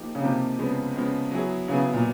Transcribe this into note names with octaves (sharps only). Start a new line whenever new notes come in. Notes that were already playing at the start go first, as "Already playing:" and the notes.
Already playing: F3 A#3 D#4 G4
C#3
C3 F3 A#3 D#4 G4
C#3 F3 G#3 B3
C#3 F3 G#3 B3
F#3 B3 E4 G#4
C#3 F#3 B3 E4 G#4
A#2